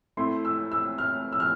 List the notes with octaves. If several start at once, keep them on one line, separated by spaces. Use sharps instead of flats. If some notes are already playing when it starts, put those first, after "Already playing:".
A3 C4 E4 C6
E6
E6
F6
E6
F6